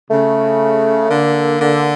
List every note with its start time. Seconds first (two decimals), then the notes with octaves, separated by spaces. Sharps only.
0.10 C#3 A3
1.09 D3 A#3
1.59 D3